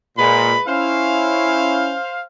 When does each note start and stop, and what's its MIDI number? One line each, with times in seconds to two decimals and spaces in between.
0.18 0.54 46
0.18 0.61 56
0.18 0.61 71
0.18 0.61 83
0.68 1.95 61
0.68 1.95 64
0.68 2.22 72
0.68 2.22 77